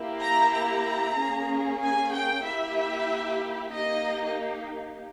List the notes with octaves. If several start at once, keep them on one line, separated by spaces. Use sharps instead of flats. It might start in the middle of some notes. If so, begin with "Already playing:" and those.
Already playing: A#3 E4 G4
A#5
A#5
A#3 C#4 G#4
G#5
G5
A#3 E4 G4 E5
A#3 D#4 G4 D#5